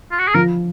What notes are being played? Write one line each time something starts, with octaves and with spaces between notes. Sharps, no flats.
F4
F#4
G#4
F3 A#4